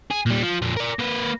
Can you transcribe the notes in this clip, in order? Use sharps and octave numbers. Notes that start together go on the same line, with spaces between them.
G#4
A#2 G3
F3
F2 A#2
A#4 D5
A#3 B4